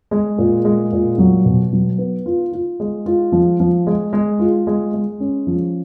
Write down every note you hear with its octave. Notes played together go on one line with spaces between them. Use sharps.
G#3
A#2
G#3
A#2
F#3
B2
F#3
B3
F4
F4
G#3
F4
F3
F3
G#3
G#3
F4
G#3
G#3
C#4
F3